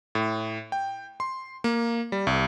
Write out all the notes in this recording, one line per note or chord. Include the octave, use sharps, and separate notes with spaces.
A2
G5
C6
A#3
G3
C2